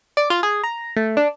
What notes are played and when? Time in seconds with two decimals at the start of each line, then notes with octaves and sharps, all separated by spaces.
0.17 D5
0.30 F4
0.43 G#4
0.64 A#5
0.96 A3
1.17 D4